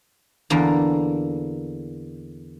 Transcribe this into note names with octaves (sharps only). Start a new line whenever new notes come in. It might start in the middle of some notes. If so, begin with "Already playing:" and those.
E2 D3 A#3